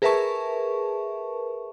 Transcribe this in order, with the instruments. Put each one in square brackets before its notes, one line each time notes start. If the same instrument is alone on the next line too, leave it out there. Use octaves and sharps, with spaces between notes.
[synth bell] G#4 A#4 B4 E5 A5 C#6